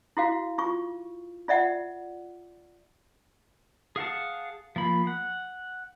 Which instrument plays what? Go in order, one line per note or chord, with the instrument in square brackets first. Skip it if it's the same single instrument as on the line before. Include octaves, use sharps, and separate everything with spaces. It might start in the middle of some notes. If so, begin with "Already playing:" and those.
[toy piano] E4 F#4 F5
F4 C#6
F4 D5 E5 F#5
[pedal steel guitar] G#4 F5 F#5 A5
F3 A#3 B5
F#5